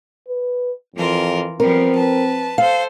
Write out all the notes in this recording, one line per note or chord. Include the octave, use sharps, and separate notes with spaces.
B4
F2 E3 F4 A#4
F3 G3 B3 C4 A#4
B4 A5
A4 C5 F5